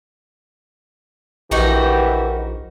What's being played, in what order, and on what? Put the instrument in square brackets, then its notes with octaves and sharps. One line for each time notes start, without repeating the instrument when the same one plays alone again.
[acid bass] A#1 [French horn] E3 [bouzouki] D#4 F#4 A#4 [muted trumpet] G4